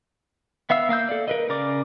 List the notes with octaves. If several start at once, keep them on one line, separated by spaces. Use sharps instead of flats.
B3 E5 F5 E6
A#3 F5 E6 G6
A4 D5
A#4 B4 D#5
C#3 A#4 D5 D6